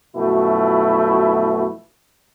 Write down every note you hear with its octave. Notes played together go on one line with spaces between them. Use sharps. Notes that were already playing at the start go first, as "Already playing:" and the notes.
F#2 B2 F3 A3 E4 F#4